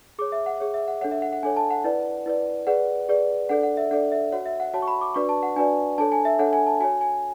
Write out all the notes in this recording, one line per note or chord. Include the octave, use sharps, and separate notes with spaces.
G#4 C#5 D6
E5
F#5
G#4 C#5
E5
F#5
D4 A4 C#5 F#5
E5
F#5
F#5
D4 A4 C#5 G#5
A5
F#5
E4 B4 D5
E4 B4 D5
G#4 B4 D5 F#5
G#4 B4 D5
D4 A4 D5 F#5
F#5
E5
D4 A4 D5 F#5
E5
F#4 C#5 F#5
E5
F#5
F#4 C#5 A5
C#6
B5
D6
D4 F#4 B4 D5 C#6
A5
F#5
D4 F#4 B4 D5 G#5
D4 A4 C#5 A5
G#5
E5
D4 A4 C#5 F#5
G#5
A5
F#4 C#5 G#5
G#5